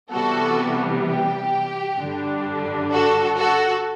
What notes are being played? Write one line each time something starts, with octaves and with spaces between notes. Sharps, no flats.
C3 E3 G3 B3 F#4 A4
G4
G2 D3 G3 D4
F#4 A4
F#4 A4